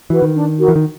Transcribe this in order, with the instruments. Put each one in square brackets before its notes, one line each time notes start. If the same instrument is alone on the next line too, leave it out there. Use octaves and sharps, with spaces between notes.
[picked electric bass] E3 [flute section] F#4 B4
[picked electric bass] D#3
[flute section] D4
F#4 A#4
[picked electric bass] E3
D#3